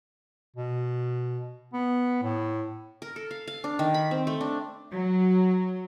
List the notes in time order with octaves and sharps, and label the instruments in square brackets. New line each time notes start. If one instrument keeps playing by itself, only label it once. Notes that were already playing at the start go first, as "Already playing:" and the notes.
[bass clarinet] B2
B3
A2
[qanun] A#4
A4
F5
F5
D4
D#3
B5
C4
A3
D4
[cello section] F#3